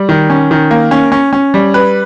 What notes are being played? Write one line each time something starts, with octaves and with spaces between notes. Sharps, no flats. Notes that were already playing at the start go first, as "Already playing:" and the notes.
Already playing: G3
D#3
C#4
D#3
A#3
C#4
C#4
C#4
G3
B4